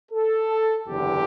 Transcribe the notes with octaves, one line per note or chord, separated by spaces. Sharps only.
A4
F#1 E2 D3 G4